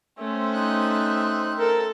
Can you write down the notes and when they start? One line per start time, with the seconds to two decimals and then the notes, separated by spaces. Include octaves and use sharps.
0.18 A3 C4 C#4 C5 E5
0.54 D#4 F#6
1.59 A4 A#4